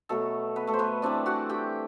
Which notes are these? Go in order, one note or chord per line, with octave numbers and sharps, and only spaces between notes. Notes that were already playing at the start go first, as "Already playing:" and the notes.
B2 F#3 A3 B3 A4
B3 B4
A3 A4
C5
B3 B4
E3 G3 C4 D4 D5
F#4 F#5
G4 G5